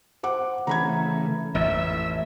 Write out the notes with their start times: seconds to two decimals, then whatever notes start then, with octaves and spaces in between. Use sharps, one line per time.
0.23 C5 F#5 D6
0.67 C#3 E3 A3 A#5 B5 G#6
1.55 A1 F2 A2 E5 E6